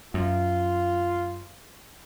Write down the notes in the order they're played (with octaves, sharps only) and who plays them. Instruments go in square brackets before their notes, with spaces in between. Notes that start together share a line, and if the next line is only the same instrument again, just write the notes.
[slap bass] F#2 [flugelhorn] F4